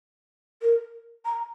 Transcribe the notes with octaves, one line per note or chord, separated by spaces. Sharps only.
A#4
A#5